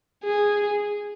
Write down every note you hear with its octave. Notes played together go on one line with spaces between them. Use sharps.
G#4